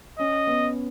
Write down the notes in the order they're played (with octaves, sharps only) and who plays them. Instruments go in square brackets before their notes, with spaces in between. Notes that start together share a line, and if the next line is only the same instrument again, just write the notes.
[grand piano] C#4 [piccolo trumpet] D#5
[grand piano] B3